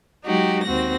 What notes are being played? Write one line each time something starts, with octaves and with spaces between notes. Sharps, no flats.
F#3 G#3 D#4 F#4 G4
D#2 C4 F#4 A#6